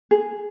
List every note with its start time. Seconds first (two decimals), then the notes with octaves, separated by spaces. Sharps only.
0.11 G#4